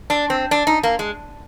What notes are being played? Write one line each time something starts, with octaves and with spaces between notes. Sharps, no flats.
D4
C4
D4
D#4
A#3
G#3